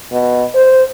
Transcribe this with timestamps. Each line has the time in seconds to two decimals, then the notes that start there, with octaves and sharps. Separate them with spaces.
0.12 B2
0.55 C5